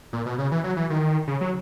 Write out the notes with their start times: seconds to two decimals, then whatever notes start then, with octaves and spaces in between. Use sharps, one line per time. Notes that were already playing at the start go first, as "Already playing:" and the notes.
0.13 A#2
0.26 B2
0.38 C#3
0.52 E3
0.64 F#3
0.77 E3
0.90 D#3
1.27 C#3
1.41 F#3